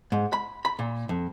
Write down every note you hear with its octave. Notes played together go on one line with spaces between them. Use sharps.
G#2
B5
B5
A#2
F2